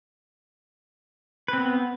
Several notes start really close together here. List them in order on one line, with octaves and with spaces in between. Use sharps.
B4 C4 B3